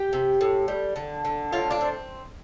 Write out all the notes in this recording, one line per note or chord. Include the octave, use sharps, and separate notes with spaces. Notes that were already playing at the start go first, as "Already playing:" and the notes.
Already playing: G4 G5
C3
A2
G3
D3
D3
A2 F4 F5
D4 D5
C4